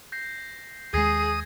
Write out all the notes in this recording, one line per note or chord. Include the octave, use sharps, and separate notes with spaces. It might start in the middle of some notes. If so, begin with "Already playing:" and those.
G6 A#6 C7
D#2 G#3 G#4 D#6 G#6 A#6 C7